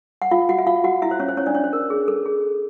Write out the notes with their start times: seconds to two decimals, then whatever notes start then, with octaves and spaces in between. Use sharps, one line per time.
0.22 F#5
0.31 F4 F5
0.49 F#4 F#5
0.58 E5
0.67 F4 F5
0.84 F#4 F#5
1.02 E4 E5
1.11 C5
1.20 C#4 C#5
1.28 C5
1.37 C#4 C#5
1.46 D4 D5
1.55 C#4 C#5
1.64 C5
1.73 A#4
1.90 G#4
2.08 A4
2.26 G#4